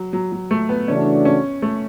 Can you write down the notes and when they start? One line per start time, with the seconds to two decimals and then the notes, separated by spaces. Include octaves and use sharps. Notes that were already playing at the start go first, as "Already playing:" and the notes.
Already playing: F#3
0.13 F#3
0.32 F#3
0.51 A3
0.69 B3
0.88 C#3 E3 A3 C#4 D4 F#4
1.25 C#4
1.62 A3